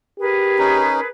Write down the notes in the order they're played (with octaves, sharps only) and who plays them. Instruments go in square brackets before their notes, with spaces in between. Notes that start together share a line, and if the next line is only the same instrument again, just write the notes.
[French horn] G4 [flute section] G#4 A#4 B4
[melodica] C#4 D#4